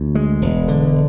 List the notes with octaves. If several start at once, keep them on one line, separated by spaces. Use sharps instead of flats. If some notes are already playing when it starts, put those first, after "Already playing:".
Already playing: D2
G#3
E1
D3